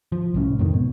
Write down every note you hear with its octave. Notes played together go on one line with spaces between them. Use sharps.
F3
C2 A2 C#4
F2 G#2 C3 D#3
B2